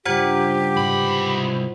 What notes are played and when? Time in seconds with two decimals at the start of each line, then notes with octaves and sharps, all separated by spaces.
0.05 G2 C#3 G3 F4 G4 C5 F#5
0.76 C2 G#2 B2 B5